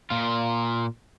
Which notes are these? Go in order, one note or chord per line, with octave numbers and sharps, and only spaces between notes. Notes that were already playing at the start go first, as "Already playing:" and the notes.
A#2 F4